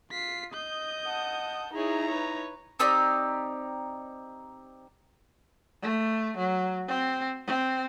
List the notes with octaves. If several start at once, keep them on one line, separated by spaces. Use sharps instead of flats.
F4 B6 C7
D#5 D#6 G6
F#5 A5
D#4 E4 G#4 C#5 A#5
B4 C#5
C4 D#4 G4 D5
A3
F#3
C4
C4